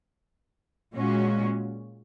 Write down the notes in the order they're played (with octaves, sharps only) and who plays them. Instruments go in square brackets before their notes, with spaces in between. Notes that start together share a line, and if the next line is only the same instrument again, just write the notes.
[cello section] A#2 G#3 C#4 F#4